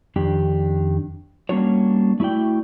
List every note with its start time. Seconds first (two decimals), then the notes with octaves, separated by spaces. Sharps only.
0.16 F2 D#3 D4 G4
1.49 G3 A#3 C#4 D4 F#4 C#5
2.20 A3 E4 F#4 D5 G5